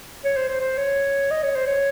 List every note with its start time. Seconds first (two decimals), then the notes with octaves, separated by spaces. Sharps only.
0.24 C#5
0.37 C5
0.49 C5
0.61 C5
0.78 C#5
1.31 D#5
1.43 C#5
1.56 C5
1.67 C#5